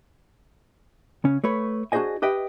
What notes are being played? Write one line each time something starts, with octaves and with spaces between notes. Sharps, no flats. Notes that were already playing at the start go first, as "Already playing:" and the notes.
C#3 C#4
A3 B4 C#5
D4 F#4 G#4 C5 D#5 G#5
G4 B4 D#5 E5 G5